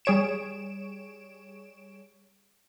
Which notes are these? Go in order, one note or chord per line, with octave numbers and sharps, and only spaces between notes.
G3 G#4 C#5 D7 E7